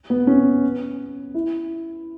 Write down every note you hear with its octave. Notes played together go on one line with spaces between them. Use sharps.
B3
C#4
E4